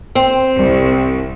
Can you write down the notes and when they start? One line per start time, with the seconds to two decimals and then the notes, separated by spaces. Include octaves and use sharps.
0.15 C4
0.58 C2